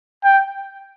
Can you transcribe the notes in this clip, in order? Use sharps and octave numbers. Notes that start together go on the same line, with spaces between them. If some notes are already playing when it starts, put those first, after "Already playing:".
G5